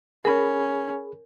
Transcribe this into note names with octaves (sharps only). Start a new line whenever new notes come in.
C#4 G#4 A#4 B5